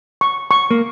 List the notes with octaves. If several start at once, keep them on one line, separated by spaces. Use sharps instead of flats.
C#6
C#6
A#3